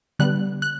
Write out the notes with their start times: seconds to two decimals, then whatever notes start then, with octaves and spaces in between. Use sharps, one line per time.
0.19 D3 G3 B3 F#6
0.62 F#6